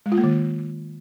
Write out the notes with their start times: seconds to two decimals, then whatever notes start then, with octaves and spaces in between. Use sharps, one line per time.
0.06 G#3
0.12 F4
0.18 A#3
0.24 D#3